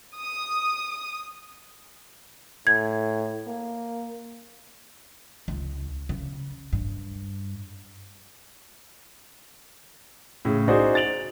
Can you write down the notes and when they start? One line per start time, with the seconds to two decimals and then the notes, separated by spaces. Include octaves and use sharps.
0.18 D#6
2.67 A2 G#6
3.47 A#3
5.48 C#2
6.09 C#3
6.73 G2
10.45 A2 C#3
10.68 D#4 F#4 G#4 C5 D5
10.95 A6 D7 F7 F#7